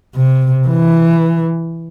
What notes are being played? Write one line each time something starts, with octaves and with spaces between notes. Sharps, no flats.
C3
E3